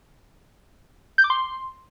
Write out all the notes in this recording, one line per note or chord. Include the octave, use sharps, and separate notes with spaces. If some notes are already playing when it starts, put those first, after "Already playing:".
G6
D6
C6